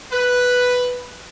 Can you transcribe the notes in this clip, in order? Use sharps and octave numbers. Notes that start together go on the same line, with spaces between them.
B4